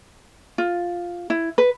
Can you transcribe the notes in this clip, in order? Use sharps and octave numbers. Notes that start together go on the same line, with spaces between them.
F4
E4
B4